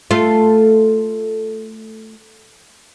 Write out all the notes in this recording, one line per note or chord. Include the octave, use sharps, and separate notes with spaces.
A3 F4